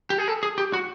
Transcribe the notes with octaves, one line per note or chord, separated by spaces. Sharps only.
G4
G#4
A4
G#4
G4
F#4